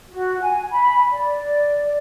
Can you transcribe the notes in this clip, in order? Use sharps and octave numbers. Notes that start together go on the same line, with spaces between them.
F#4
G#5
B5
D5